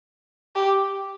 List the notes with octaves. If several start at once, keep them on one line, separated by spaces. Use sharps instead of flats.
G4